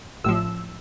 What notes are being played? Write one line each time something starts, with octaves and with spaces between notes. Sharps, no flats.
A1 A2 F3 E6